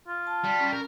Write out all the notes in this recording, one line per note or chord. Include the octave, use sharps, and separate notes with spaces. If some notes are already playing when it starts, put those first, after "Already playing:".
F4
A5
G3 A5
C#4
A#4